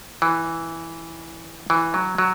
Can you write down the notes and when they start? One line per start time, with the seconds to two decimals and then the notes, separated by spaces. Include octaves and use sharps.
0.22 E3
1.70 E3
1.94 F#3
2.18 F#3